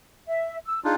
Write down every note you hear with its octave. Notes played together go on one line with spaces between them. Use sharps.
E5
E6
D4 D#4 F4 G#4